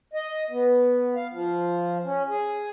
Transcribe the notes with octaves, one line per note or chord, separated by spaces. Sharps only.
D#5
B3
F5
F3
C#4
G#4